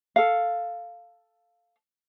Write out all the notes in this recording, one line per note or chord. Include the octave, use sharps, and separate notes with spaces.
A4 F5